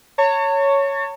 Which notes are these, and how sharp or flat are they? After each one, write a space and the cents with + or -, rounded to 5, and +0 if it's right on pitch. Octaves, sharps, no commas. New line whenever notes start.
C#5 +0 A5 +45